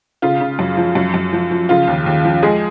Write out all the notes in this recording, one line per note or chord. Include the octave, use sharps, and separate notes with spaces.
C#3 F4
C#3
F#2
F3
F#2
F#2
F3
F3
C#3 F4
D#2
D#2
F3
G#3 G#4